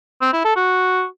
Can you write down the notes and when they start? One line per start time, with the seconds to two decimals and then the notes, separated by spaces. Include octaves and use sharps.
0.21 C4
0.33 E4
0.45 A4
0.56 F#4